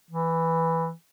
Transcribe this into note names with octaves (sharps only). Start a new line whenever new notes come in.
E3